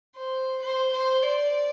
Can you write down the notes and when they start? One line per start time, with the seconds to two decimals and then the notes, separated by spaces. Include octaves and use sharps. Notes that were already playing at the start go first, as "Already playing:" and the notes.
0.16 C5
0.62 C5
0.92 C5
1.22 D5